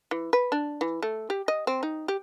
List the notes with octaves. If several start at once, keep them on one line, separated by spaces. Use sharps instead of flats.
E3
B4
D4
E3
A3
G4
D#5
C4
D#4
G4